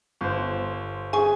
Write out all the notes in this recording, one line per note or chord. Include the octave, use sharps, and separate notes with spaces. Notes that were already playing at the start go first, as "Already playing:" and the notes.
G1 C5
G#4 G#5 C#6